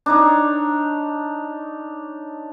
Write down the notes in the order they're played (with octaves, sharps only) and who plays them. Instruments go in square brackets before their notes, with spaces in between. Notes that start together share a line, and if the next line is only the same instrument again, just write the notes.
[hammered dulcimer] D4 D#4 C#5